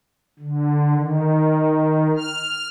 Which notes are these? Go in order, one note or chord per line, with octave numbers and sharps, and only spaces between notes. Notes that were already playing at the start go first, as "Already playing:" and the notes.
D3
D#3
F6